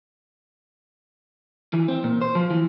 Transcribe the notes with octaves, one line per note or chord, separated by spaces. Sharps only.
E3
C4
A#2
C5
F3
E3